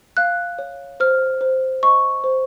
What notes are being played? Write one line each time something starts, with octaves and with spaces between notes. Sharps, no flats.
F5 F#6
C#5
C5 F6
C5
D#5 C#6
C5